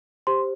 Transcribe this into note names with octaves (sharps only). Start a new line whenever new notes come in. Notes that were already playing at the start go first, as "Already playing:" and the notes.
G4 C5 C6